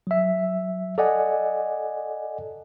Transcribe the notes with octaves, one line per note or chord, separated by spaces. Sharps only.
F#3 E5
A4 D5 D#5 F#5 G#5